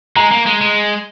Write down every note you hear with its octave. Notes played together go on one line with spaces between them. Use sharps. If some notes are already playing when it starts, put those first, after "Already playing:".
G#3 A#5
A#3
G#3
G#3